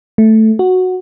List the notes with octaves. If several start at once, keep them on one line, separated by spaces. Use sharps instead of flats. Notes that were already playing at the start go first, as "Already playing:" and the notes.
A3
F#4